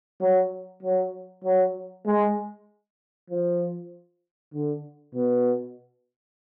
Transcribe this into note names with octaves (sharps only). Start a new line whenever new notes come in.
F#3
F#3
F#3
G#3
F3
D3
B2